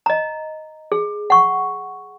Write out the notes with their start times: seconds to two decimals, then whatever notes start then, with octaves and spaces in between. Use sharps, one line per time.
0.06 D#5 A#5
0.92 G#4
1.30 F#5 C#6